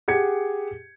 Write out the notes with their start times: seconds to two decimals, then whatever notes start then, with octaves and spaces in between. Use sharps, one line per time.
0.08 G4 G#4 F#5 G#6 C#7